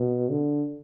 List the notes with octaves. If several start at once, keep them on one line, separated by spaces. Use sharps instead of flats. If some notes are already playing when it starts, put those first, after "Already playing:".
Already playing: B2
D3